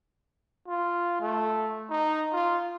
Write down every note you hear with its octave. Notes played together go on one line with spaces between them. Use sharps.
F4
A3
D#4
F4